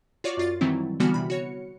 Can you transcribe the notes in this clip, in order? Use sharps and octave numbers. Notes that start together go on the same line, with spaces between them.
F4 F#4 C#5 D5 C#6 D6
F#2 F4 A6
D#3 E3 F#3 G3 C4 E4
D3 E3 G3 B3 F#4 F6
C3 B5
F#4 C#5 C#7